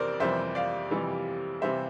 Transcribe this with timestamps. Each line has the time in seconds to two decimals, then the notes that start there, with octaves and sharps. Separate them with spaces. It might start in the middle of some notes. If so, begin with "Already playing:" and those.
Already playing: F2 C3 E3 G3 A#4 C5 D5
0.20 F2 C3 E3 G3 C5 E5
0.55 D5 F5
0.91 F2 C3 E3 G3
1.62 C3 E3 G3 C5 E5